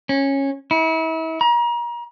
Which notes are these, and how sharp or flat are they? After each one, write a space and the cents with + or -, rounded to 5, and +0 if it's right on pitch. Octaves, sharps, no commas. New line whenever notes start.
C#4 -15
E4 -35
A#5 +35